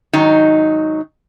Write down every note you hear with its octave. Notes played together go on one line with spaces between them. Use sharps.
G#2 D#3 F#3 D#4